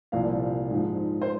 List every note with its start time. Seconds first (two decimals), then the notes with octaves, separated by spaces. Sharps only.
0.12 C2 A#2 F3 F5
0.70 G#2 F3
1.22 C5